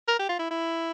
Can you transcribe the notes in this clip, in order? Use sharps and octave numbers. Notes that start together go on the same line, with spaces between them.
A#4
G4
F4
E4
E4